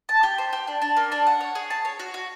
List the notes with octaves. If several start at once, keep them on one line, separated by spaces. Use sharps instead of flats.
A5
G4
C5
G4
D4
D4
A#3
D4
F#5
C#5
G#4
A5
C#5
F#4
F#4